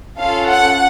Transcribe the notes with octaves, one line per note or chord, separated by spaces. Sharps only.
C#4 F4 A4 F5
F#5